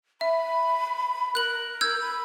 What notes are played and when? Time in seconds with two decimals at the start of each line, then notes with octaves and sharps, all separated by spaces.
0.21 E5 B5
1.35 A#4 F#6 F#7
1.81 E6 G6 G#6
2.01 B5